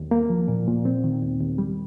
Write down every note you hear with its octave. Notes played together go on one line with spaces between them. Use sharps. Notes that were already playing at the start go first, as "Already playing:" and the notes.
Already playing: D#2
A#3
F3
A#2
A#2
C4
D#3
D#2
D#2
G3